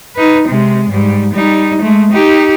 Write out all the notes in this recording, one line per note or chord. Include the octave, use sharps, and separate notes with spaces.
D#4 B4
C3 G#3
G#2 G3
G3 D#4
G#3 A3
D#4 G4